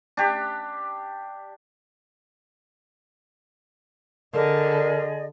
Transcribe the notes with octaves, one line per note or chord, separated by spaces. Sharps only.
D4 G4
D3 G#4 A#4 D5 D#5